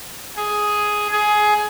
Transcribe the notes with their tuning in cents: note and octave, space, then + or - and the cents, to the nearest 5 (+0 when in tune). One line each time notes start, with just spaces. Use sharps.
G#4 +5
G#4 +15